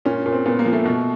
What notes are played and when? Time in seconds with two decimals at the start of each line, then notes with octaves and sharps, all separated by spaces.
0.05 A#2 C#4
0.26 A#2
0.33 C4
0.46 A#2 B3
0.59 A#3
0.65 F3
0.73 A3
0.85 B2